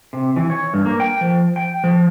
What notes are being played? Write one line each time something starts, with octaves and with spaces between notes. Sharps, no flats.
C3
E3
C#5
G2
A#3
G5
F3
G5
F3